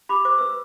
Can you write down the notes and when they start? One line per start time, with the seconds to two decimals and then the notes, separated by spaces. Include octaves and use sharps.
0.09 G4 B5 D6
0.25 C5 D6
0.38 B4 E6